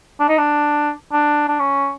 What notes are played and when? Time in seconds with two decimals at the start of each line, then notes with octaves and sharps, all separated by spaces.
0.20 D4
0.29 D#4
0.38 D4
1.13 D4
1.49 D4
1.60 C#4